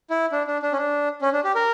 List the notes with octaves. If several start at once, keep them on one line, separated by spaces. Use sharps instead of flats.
E4
D4
D4
D4
C#4
D4
C#4
D4
G4
A#4